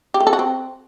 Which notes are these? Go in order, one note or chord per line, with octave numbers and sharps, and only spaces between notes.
G4
A3
A4
F#4
C4